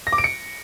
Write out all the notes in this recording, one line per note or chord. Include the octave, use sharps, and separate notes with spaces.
A#6
D6
D7
C#7